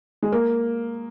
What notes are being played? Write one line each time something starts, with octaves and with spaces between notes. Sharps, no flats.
G#3
A#3